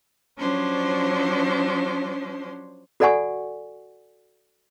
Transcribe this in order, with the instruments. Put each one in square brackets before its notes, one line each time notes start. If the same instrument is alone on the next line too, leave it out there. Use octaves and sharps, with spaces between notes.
[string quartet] F3 F#3 C#4 D4 C5 C#5
[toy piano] F#4 A4 D5 F#5 G#5 C#6